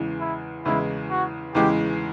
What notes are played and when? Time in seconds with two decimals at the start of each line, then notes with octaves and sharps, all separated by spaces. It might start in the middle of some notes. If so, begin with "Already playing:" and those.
Already playing: E2 C#3 E3 G#3
0.20 E4
0.65 E2 C#3 E3 G#3 E4
1.10 F#4
1.55 E2 C#3 E3 G#3 G4